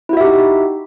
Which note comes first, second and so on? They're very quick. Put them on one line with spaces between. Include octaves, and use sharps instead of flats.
E4 F#4 E5 G4 D#4